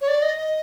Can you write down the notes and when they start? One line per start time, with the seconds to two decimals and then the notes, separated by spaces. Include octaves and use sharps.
0.01 C#5
0.08 D5
0.22 D#5
0.38 D#5